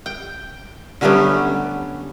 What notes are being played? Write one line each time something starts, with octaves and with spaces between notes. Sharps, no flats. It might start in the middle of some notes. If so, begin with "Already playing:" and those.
G5
D3 F#3 G3 A3 B3 C#4